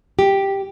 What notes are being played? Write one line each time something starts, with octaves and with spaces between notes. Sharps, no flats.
G4